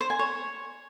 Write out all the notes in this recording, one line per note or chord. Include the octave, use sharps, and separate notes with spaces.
C5
G#5
C#5